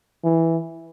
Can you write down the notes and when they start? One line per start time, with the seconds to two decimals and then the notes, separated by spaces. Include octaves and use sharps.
0.24 E3